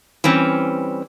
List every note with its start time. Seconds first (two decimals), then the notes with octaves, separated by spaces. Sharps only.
0.24 E3 G3 C4 C#4